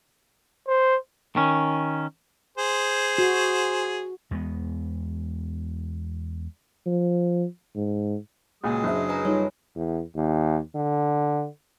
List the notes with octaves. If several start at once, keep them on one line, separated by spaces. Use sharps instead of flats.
C5
D#3 C#4
G#4 C5
F#4
E2 G#3 A#3 B3
F3
G#2
C#2 A#2 F#3 G#3 G#5 D#6
F#1 D4 E5
B4 G#5 A#5
G3 D#4 F4 C#5
E2
D#2
D3